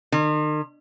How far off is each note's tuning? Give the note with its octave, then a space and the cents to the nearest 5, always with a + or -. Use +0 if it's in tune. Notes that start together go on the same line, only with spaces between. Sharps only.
D#3 -45